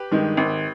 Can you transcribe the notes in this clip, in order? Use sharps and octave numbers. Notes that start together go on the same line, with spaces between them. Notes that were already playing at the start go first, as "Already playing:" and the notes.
Already playing: G4 B4
G2 D#3 G#3
G#1